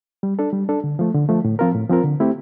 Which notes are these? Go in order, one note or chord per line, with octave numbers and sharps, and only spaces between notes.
G3
D4 A4
G3
D4 A4
D3
F3 A3
D3
F3 A3
A2
F3 C4 F4 A#4
A2
F3 C4 F4 A#4
D3
A3 C4 E4 G4